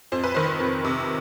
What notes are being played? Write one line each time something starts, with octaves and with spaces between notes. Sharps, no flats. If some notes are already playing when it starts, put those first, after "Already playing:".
F2 C5
B4
D#3 C5
F2
C3